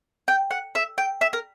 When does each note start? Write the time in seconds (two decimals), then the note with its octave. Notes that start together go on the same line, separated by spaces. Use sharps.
0.28 G5
0.51 F#5
0.75 E5
0.98 G5
1.21 E5
1.33 A#4